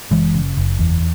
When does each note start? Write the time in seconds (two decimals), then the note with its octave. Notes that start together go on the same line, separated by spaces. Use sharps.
0.11 F#1 E3 G#3
0.35 C#3
0.57 F#1
0.79 E2